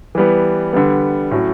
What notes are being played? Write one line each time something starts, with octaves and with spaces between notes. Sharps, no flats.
E3 G3 B3
D3 G3 B3
A2 F#3 C#4 F#4